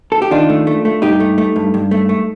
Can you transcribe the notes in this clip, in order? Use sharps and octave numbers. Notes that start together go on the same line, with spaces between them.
A4
G4
D#3 D4 F4
A3
A3
A3
G2 D#4 G4
A3
A3
G2
G2
A3
A3